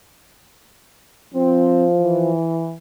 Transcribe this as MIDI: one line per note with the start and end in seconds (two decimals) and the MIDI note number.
1.34 2.32 53
1.34 1.86 60
2.01 2.74 52